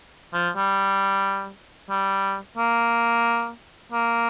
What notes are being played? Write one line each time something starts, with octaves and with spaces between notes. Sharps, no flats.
F3
G3
G3
A#3
A#3